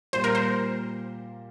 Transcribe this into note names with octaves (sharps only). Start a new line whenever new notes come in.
A#2 G3 A#3 F4 C5
A#4
C5